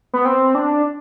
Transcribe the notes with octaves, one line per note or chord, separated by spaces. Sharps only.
B3
C4
D4